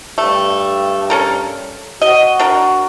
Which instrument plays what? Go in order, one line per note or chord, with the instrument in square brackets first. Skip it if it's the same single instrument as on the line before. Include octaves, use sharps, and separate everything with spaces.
[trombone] G2 [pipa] A3
[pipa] C#4 A4 A#4
[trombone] F#4 [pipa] D#5
[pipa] D4 A#4